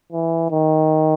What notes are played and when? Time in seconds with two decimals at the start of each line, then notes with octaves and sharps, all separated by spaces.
0.13 E3
0.51 D#3